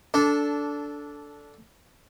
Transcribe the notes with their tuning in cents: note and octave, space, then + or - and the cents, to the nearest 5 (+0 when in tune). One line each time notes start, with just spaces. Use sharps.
D4 -15 A4 +0